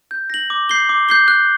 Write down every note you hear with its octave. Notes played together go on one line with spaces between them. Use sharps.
G6
A#6 F#7
D6
G6 C7 G7
D6
G6 C7 G7
F#6